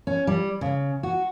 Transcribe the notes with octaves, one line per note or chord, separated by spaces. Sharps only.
C#4
G3
C#3
F#4